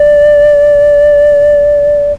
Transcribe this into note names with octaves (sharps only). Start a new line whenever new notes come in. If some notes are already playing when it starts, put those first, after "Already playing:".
Already playing: D5